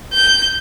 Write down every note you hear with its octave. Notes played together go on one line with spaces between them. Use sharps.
G6